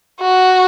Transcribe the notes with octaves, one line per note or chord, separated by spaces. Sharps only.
F#4